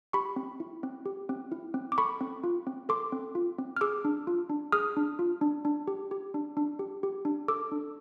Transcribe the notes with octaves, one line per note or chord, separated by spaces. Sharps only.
G4 B5 C#6
C4
E4
C4
G4
C4
E4
C4
D6
A4 B5 C#6
C4
F4
C4
A4 C6 D6
C4
F4
C4
F6
G#4 D6 E6
D4
F4
D4
G#4 D#6 F6
D4
F4
D4
D4
G4
G4
D4
D4
G4
G4
D4
A4 D6 E6
D4